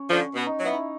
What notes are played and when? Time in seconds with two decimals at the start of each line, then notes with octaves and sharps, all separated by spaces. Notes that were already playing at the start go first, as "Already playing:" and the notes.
Already playing: C#4
0.09 D3 F3
0.34 B2
0.47 D#4
0.60 F#3 B3 E4
0.73 D#4